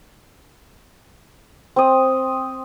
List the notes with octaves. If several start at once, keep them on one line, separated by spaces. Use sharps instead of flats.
C4 D#6